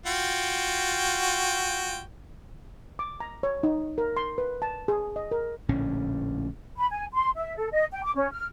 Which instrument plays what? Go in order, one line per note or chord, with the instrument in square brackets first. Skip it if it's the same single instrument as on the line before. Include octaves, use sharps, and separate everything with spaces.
[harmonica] F4 F#4 G5
[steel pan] D6
A#5
C#5
D#4
A#4
C6
B4
A5
G#4
D#5
A#4
[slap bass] A#1 A2 D3 C#4
[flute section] B5
G#5
C6
E5
A4
D#5
G5
D6
C#4
F6